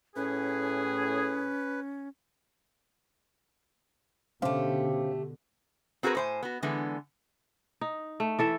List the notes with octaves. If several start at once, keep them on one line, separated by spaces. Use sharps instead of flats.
A2 C#4 G#4 B4
B2 D3 A3 C#4 G4 C5 F5
C4 F#4 G#4 A#4 B4
A2 C5 G#5
B3 F#4
D3 E3 G#3 B3
D#4
A3
E3 A4 E5